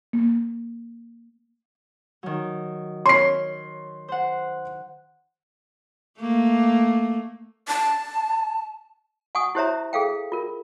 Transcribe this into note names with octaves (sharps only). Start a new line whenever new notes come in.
A#3
D#3 F#3
C#5 C6 F6 C7
C5 F#5
A3 A#3
A5
F#5 G#5 C#6 D#6
E4 G4 C5 C#5 E5 A#5
G#4 A4 F5 G5
F4 A#4